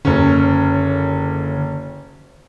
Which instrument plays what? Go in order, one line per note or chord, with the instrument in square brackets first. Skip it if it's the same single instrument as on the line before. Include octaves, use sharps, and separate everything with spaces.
[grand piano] F#1 C#4 [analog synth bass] D3